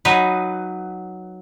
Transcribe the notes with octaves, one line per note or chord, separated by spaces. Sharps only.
F#3 D#4 B4